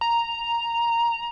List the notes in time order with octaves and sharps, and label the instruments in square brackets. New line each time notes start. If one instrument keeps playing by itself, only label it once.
[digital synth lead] A#5